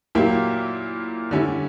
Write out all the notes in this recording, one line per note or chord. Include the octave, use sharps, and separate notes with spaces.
A#2 F#3 A#3 E4 G4
D3 G3 C#4 E4